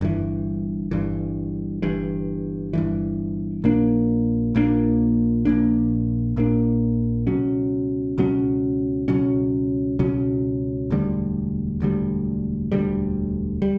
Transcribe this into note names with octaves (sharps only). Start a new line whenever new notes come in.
G1 G2 E3
G1 G2 E3
G1 G2 E3
G1 G2 E3
A#1 A#2 A#3 D4
A#1 A#2 A#3 D4
A#1 A#2 A#3 D4
A#1 A#2 A#3 D4
C#2 B2 F#3 C#4
C#2 B2 F#3 C#4
C#2 B2 F#3 C#4
C#2 B2 F#3 C#4
E1 D2 D3 G3
E1 D2 D3 G3
E1 D2 D3 G3
G3